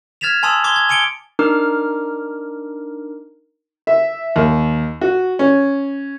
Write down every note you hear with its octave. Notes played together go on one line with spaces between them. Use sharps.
F6 G#6 A6 B6 E7 F7
G#5 A5 C6 D#6 E6
C6 D6 G#6 G7
G#6
G#5 D6 C#7 D7 G7
D4 D#4 A#4 D6 F6
E5
D#2
F#4
C#4